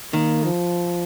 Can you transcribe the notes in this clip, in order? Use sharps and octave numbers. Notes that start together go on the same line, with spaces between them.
D#3 A#3
F3